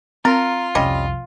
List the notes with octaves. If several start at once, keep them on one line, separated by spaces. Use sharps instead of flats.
C4 F4 A#4
C2 F2 G3 C#4 D#5